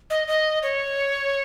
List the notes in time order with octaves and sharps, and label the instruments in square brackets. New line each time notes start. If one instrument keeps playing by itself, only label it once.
[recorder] D#5
D#5
C#5